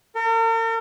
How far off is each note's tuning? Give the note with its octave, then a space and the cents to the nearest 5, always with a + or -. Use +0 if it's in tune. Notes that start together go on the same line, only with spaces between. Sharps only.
A#4 -45